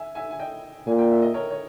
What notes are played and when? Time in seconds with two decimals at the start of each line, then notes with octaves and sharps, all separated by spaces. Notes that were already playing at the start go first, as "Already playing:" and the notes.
Already playing: E5 G#5
0.15 E5 G#5
0.31 G#5
0.39 D#5 G5
0.87 A#2 G#5
0.99 G5
1.11 E5
1.22 D#5
1.34 A#4 C#5
1.51 C#5